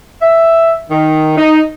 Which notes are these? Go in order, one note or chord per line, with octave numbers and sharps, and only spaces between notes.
E5
D#3
D#4